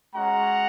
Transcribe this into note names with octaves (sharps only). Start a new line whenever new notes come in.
G#3 C#4 F#4 F#5 A#5